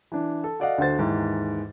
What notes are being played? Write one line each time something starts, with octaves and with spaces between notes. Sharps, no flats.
E3 D4
A4
F#4 A4 D5 D#5 F5 F#5
D2 D3 F#4 C5 A6
D#2 G#2 E3